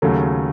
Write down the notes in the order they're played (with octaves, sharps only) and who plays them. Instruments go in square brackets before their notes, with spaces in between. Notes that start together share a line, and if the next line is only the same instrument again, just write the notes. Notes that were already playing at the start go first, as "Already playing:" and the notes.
[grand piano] D#2 C#3 F#3 A3